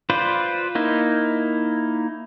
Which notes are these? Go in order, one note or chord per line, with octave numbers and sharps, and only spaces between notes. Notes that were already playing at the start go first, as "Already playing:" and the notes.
F4 B4 C5 D5
A#3 D#4 E4